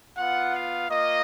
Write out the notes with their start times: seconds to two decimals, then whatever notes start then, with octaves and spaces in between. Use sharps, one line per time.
0.17 B3 F4 F#5
0.54 F5
0.90 A#3 F4 D#5